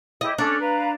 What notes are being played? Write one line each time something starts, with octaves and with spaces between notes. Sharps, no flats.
E4 G4 D#5
C#4 D4 A4 D6
B4 F5 A#5